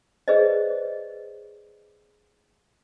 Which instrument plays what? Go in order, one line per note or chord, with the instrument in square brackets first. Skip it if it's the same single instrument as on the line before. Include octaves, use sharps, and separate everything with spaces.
[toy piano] G#4 B4 C5 D5 D#5